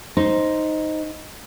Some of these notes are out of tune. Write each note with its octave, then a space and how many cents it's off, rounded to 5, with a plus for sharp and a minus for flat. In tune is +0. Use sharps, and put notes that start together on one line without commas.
D#4 +0 C5 +0